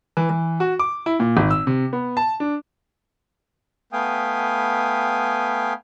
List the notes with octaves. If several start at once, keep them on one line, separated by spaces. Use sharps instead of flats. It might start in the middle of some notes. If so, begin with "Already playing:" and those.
E3
E3
F#4
D6
E4
A#2
G#1
E6
C3
B3
A5
D4
A3 B3 F5 G5 G#5 D#6